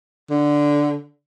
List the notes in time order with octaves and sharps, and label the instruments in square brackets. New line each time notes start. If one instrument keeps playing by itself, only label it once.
[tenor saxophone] D3